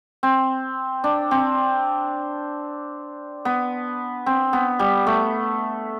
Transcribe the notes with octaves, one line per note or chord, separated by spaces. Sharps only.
C4
D4
C4
B3
C4
B3
G3
A3